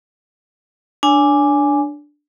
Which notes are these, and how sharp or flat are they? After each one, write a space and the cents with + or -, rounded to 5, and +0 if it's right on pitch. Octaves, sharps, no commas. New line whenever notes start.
D4 +0 C#5 +45 G#5 +0